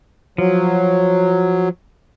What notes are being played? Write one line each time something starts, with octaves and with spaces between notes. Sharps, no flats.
F3 F#3